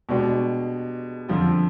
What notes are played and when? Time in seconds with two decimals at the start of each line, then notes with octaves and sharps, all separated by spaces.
0.09 B2 G#3 D4 G4
1.29 F2 D3 F3 C4